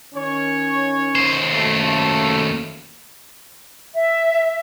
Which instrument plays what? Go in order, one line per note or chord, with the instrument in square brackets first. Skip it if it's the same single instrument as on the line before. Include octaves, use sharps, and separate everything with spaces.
[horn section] D#3 C#4 C#5
[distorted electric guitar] D#2 C5
[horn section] F#2 A3
[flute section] E5